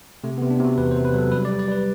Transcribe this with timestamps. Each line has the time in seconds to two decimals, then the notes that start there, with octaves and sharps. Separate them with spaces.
0.24 C3 A3
0.38 B3
0.42 C3
0.51 D4
0.60 C3
0.65 F#4
0.78 E2 B4
0.91 C5
0.96 C3
1.05 B4
1.14 F#3 A4
1.32 G3 B4
1.45 D5
1.49 G3
1.59 D5
1.68 G3 B4